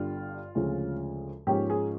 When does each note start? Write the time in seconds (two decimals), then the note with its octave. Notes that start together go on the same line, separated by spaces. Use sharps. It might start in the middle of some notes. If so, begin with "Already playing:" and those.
Already playing: G1 G2 D3 G3 F4
0.55 D2 C#3 F3 G#3
1.47 G#2 F3 A#3 C#4 G4
1.70 G#4